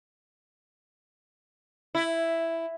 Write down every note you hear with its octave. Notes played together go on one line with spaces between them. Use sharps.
E4